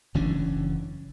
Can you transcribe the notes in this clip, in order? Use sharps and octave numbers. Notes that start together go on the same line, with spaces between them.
F#1 E3 C#4 D4